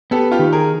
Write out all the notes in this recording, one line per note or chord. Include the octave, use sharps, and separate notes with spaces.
B3 G4 A4
F4 G4
D#3
G#4 A#4